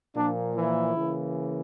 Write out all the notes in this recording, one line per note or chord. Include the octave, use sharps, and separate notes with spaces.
A#2 F3 A#3 D4
E3 E4
C#3 E3 A#3